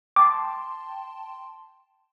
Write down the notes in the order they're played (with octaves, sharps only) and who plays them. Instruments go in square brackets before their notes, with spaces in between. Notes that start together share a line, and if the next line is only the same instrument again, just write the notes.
[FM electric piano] G5 A5 C6 [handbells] D6